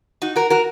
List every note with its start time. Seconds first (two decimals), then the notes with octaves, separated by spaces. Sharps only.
0.22 D#4 F#4
0.36 F#4 A#4
0.50 F#4 A#4